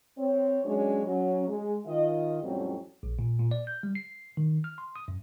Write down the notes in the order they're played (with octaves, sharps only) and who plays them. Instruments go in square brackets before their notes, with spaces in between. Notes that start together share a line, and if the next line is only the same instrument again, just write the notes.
[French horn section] C4 C#5
F#3 G#3 C#4 D4 C#5
F#3 C#4
G#3
D#3 F4 D#5
F2 A2 F#3 G3 C4 C#4
[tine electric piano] A#1
A#2
A#2
D5
G6
G3
C7
D#3
F6
C6
D#6
F#2